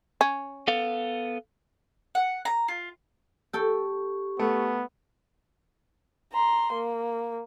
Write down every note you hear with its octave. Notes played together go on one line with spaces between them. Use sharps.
C#4
B3 A4 F5
F#5
A#5
F4
G4 A4 G5 C#6
A3 B3
A#5 C6
A#3